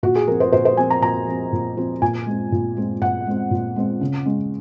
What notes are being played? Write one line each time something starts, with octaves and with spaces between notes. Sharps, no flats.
A#2 F#4
G#4
F3 C4 A#4
C5
A#2 C5
C5
F3 C4 G#5
A#5
A#2 A#5
F3 C4
A#2
F3 C4
A#2 G#5
G#3 C4
A#2
G#3 C4
A#2 F#5
G#3 C4
A#2
G#3 C4
C#3
G#3 C#4